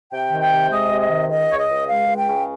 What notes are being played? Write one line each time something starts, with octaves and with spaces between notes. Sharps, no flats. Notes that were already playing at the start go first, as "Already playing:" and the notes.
C3 G5
D#3
G5
C3
G#3 D#5
C3
D#5
D#3
C#2 D#5
C#3 C#5
D#5
C#2
G#3 F5
C#2
G5
C#3